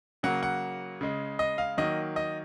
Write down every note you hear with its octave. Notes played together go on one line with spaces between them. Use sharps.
C#3 F#3 A#3 F#5
F#5
C#3 G#3
D#5
F5
D#3 F#3 A#3 D#5
D#5